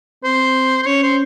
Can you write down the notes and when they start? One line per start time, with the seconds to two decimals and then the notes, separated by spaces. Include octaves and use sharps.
0.24 C4 C5
0.82 C5
0.86 C#4 C#5
1.03 C5